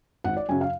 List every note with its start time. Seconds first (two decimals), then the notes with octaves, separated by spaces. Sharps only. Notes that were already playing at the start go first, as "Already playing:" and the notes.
0.24 G#1 F#5
0.37 D5
0.49 F#2 C#3 F#3 G#5
0.61 F5